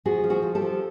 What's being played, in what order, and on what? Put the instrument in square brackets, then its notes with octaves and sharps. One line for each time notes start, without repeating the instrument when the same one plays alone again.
[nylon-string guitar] F3 F#4 G#4
F3
F#4 G#4
F3
G4 A4
F3